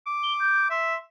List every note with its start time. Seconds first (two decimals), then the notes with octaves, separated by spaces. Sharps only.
0.07 D6
0.23 G7
0.40 G6
0.70 E5 C6